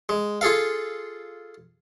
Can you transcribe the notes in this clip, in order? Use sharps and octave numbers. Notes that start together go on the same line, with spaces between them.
G#3
F4 G#4 A4 F5